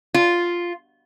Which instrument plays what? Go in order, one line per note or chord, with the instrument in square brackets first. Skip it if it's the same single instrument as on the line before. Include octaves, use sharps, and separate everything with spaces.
[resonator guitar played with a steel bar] F4